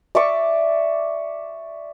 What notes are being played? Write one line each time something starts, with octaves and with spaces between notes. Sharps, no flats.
D5 E5 C#6